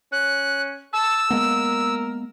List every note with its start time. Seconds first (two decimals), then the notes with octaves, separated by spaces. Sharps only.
0.12 C#4 F#6
0.93 A5 E6
1.30 G#3 A#3 B3 A#4